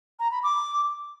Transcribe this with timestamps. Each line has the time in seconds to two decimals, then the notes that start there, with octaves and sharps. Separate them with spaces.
0.20 A#5
0.31 B5
0.43 D6